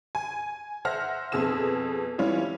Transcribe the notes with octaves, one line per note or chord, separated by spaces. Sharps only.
G#5
C5 E5 F#5 F6 A#6
F2 B2 G#4 E6 E7
E3 G3 C4 C#4 E4 F4